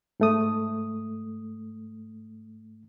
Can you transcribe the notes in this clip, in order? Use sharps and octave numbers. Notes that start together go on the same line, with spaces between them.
G#2 A3 D#6